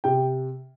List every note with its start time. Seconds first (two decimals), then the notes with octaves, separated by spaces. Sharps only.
0.04 C3 G5